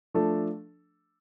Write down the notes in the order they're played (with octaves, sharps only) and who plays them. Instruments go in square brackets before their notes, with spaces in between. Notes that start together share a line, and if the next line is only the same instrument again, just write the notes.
[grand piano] F3 A3 D4 A4